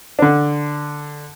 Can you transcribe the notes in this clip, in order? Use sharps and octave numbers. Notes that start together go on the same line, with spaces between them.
D3 D4